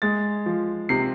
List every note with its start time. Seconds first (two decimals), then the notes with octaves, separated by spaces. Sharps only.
0.02 G#3 A6
0.46 F3
0.89 C3 C7